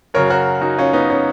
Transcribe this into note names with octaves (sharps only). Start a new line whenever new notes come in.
F#2 C#3 F#3 A#4 C#5
F#4 A#4
D#4 F#4
C#4 F4
B3 D#4
C#4